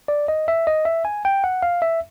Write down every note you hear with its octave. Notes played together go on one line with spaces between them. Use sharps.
D5
D#5
E5
D#5
E5
G#5
G5
F#5
F5
E5